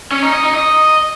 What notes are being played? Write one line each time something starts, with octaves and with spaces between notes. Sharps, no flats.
C#4
D#4
D#5
D#4
D#5